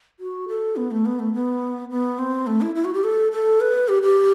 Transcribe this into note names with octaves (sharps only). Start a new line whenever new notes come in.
F#4
A4
B3
A3
B3
A3
B3
B3
C4
A3
E4
E4
F#4
G4
A4
A4
B4
G4
G4